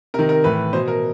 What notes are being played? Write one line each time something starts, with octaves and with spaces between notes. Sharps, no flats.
C3 D#3 A#4
A#4
A2 E3 B4
B2 C5
A#4